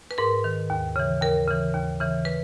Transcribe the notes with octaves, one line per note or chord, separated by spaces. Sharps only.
B4
G#2 A#4
D#3
D#2
C#3 E3
D#2 A#4
C#3 E3
D#2
C#3 E3
B4